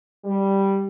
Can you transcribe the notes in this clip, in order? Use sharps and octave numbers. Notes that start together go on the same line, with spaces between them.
G3